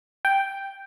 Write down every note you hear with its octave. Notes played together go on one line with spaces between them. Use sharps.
G5